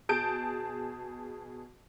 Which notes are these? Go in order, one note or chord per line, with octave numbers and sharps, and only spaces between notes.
B2 G#4 A5 G6 D7